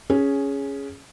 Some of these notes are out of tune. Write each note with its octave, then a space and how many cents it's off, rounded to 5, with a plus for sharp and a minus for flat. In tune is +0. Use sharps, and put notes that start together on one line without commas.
C#4 +5 G#4 +0